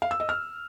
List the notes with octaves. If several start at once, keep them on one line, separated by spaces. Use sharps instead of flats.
F5
E6
D#5
F6